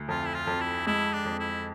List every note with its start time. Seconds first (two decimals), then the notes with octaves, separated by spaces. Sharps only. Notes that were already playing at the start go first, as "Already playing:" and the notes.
Already playing: D2
0.08 F2 F4
0.26 E4
0.34 F4
0.47 F2
0.61 E4
0.87 G#3 E4
1.13 D4
1.25 F2
1.39 E4